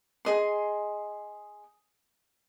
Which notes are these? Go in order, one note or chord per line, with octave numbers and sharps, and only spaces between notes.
G#4 D#5 C6